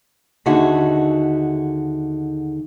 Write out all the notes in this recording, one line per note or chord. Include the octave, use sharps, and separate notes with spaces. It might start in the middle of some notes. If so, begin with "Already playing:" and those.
D#2 D3 D#4 F#4 G#4 E5